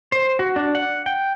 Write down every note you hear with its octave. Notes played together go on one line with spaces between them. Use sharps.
C5
F#4
D4
F#5
G5